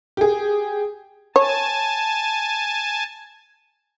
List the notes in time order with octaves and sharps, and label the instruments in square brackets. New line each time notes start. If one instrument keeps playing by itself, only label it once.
[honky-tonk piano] G4 G#4
[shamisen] C#5 [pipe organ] G#5 A5